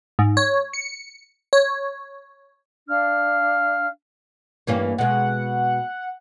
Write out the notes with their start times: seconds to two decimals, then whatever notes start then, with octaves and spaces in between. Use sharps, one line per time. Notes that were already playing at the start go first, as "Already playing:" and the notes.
0.19 G#2
0.37 C#5
0.73 C#7
1.53 C#5
2.89 D4 F5 F6
4.67 G2 E3 A#3 C#4
4.98 B2 G#3 F#5